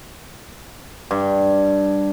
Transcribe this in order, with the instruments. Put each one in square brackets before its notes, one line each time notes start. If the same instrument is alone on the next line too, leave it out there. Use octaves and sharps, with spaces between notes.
[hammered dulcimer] G2